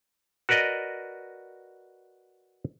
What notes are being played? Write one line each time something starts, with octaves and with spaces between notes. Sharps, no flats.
F#4 A#4 B4 D5 D#5